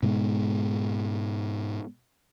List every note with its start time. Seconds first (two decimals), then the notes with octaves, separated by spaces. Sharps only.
0.03 G#2 B2 G#3